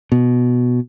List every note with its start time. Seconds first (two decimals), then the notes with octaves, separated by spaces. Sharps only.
0.12 B2